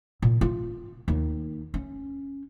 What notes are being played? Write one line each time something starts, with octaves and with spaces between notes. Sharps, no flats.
A#2
F4
D#2
C#4